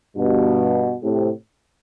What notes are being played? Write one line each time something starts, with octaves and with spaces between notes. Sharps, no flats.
G2 B2
A2 C3